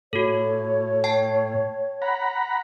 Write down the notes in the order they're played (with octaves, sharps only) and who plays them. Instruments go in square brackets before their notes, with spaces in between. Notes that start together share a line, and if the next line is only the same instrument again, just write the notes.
[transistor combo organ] A2 [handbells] F#4 A4 [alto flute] C#5
[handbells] G5 A5 C7
[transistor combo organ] F#5 A#5 B5